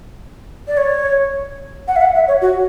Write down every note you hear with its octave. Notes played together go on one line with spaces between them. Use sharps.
D5
C#5
F#5
E5
F#5
E5
C#5
F#4